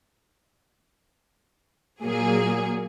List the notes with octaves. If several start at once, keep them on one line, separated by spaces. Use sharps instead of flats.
A#2 F#3 A#3 G#4